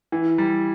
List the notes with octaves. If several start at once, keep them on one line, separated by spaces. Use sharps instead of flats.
E3
G3